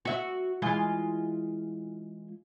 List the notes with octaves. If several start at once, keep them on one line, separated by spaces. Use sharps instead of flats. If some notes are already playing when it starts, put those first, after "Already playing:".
F#4 E5
E3 G#3 F4